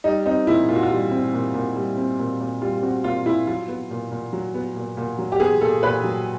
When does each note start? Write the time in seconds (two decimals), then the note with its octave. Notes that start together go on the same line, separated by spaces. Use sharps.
0.04 G3 D#4
0.26 C4 D#4
0.47 A#2 E4
0.69 A#2 F4
0.76 F#4
0.83 F4
0.90 G3
1.11 C4
1.33 A#2
1.54 A#2
1.75 G3
1.97 C4
2.19 A#2
2.40 A#2
2.61 G3 F4
2.83 C4 F#4
3.04 A#2 F4
3.26 A#2 E4
3.47 F#3 F4
3.68 B3
3.90 A#2
4.11 A#2
4.33 F#3
4.54 B3
4.76 A#2
4.97 A#2
5.19 F#3
5.32 G4
5.40 B3 G#4
5.61 A#2 A4
5.83 A#2 B4
6.04 F#3